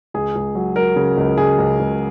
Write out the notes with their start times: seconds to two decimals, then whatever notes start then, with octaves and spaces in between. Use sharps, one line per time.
0.14 C#2 G#4
0.35 C#2
0.55 F#3
0.76 F#3 A#4
0.96 C#3
1.18 C#2
1.38 C#2 G#4
1.58 C#2
1.80 C#2